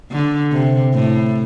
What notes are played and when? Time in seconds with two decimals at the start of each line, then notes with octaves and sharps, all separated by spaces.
0.11 D3
0.52 C3
0.94 A2